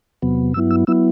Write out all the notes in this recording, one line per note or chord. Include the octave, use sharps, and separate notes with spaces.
E2 C3 F#3 B3
G2 F#3 B3 E4 E6
E6
F#3 B3 E4 E6